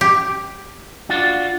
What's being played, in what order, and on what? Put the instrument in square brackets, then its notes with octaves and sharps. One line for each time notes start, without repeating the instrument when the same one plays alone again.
[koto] G4
[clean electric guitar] D4 F4 F#4